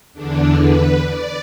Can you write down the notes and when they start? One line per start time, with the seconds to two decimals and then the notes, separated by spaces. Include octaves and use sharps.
0.14 E2 D3 D4
0.58 B4
1.03 D5